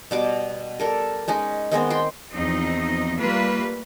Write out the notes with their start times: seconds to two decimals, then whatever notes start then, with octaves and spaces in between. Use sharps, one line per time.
0.11 B2 G3 D6
0.80 G3 A4 A#4
1.28 G#3 C#4 D#4
1.72 D#3 G#3 B3 C4
1.90 C4 G5 C6
2.33 E2 F3 C4 D#4 D#5
3.18 G3 A3 A#3 F4 B4